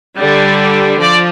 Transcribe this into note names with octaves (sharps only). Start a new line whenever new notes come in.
D3 G3 D4
F3 D5